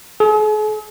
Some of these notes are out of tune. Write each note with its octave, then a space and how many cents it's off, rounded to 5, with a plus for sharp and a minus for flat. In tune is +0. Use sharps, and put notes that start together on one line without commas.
G#4 +45